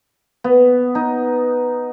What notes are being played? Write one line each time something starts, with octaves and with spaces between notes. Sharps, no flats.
B3
D#4